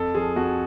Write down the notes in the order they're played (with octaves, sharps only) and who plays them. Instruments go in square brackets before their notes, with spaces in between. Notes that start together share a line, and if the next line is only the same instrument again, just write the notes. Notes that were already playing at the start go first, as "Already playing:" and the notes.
Already playing: [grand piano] F2 A4
F3 G#4
F2 F#4